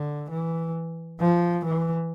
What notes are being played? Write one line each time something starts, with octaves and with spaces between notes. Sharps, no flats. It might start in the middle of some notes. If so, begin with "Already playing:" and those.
Already playing: D3
E3
F3
E3